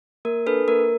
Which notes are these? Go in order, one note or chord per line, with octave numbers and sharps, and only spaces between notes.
A#3 A#4
D4 A4 B4
A#3 A#4